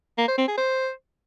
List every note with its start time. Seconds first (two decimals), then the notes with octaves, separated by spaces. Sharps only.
0.18 A#3
0.28 C5
0.38 C4
0.48 G#4
0.58 C5